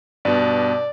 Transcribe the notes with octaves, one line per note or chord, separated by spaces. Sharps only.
G2 B2 D5